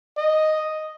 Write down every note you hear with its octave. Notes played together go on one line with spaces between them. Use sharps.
D#5